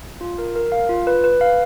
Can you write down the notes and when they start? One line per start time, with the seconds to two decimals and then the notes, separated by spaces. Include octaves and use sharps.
0.21 F4
0.38 A#4
0.56 A#4
0.72 F5
0.89 F4
1.07 B4
1.24 B4
1.41 F5